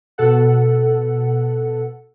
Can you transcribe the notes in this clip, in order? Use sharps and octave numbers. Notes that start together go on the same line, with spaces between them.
B2 A4 F#5